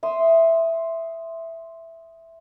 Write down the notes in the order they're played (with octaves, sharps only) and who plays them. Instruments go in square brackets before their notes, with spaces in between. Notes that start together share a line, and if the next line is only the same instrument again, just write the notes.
[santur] E5 C6 D#6